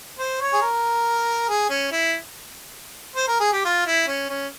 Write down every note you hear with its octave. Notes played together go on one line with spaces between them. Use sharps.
C5
C#5
G#4
A#4
G#4
C#4
E4
C5
A#4
G#4
G4
F4
E4
C#4
C#4